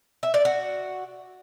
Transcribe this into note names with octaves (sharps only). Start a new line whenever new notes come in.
E5
D5
F#4